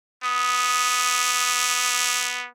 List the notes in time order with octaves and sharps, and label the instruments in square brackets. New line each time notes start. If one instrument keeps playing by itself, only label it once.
[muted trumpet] B3 [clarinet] D#6